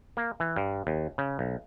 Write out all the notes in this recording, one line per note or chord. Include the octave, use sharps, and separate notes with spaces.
A#3
E3
G2
D#2
C#3
B1